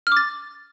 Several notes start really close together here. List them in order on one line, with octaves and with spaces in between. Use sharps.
F6 D6 A6